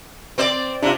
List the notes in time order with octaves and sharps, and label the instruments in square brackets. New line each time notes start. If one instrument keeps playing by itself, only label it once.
[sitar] C4 C5 D5
[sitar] C3 [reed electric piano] D4 F4